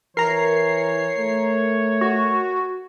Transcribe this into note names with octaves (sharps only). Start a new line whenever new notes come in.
E3 A#4 C#5 A#5 C7
A3
F#4